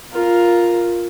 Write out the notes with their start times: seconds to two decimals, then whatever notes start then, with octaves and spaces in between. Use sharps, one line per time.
0.12 F4 A#4